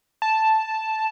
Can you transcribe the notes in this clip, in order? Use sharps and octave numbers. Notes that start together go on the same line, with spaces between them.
A5